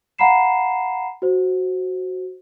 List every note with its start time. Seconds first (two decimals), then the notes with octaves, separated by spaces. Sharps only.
0.18 F5 F#5 A#5 B5 C7 E7
1.22 F#4 C5